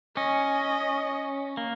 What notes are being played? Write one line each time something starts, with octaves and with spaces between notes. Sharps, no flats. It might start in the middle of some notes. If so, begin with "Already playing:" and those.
C#4 D#5
A#3